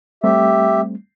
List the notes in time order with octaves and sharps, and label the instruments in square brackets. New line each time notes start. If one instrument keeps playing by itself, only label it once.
[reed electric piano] G3 A3 C4 [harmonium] G4 E5